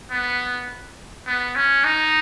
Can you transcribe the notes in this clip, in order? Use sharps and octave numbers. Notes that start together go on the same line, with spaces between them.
B3
B3
C#4
D#4